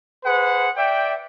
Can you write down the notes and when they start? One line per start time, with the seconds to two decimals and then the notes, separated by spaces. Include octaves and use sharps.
0.24 G#4 B4 C5 F#5
0.76 D5 E5 G5